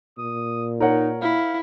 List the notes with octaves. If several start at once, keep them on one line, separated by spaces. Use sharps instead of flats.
A#2 D#6
D#4 A#4 C#5 F#5
E4 F5